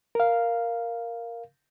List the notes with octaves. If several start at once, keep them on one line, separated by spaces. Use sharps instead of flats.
A#4 F5